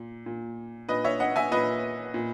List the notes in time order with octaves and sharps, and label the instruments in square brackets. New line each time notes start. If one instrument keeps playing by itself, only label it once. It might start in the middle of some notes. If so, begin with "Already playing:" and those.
Already playing: [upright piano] A#2
A#2
A#2 B4 D#5
C#5 E5
D#5 F#5
E5 G#5
A#2 B4 D#5
A#2